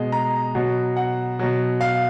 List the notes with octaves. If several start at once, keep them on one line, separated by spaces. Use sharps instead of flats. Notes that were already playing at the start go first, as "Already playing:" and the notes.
Already playing: B2 G#3
A#5
B2 F#3
F#5
B2 F#3
F5